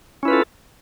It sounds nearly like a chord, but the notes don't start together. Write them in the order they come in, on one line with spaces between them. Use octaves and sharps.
C#4 E4 B4 F4 A4